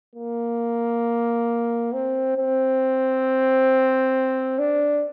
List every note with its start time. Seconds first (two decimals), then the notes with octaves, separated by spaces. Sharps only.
0.16 A#3
1.93 C4
2.37 C4
4.59 D4